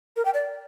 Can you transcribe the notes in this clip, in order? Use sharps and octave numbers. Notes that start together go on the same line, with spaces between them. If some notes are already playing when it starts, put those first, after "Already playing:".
A#4
G5
D5